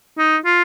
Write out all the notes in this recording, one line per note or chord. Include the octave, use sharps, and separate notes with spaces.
D#4
F4